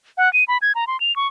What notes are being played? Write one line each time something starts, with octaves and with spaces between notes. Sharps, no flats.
F#5
D#7
B5
G#6
A#5
C6
F7
C#6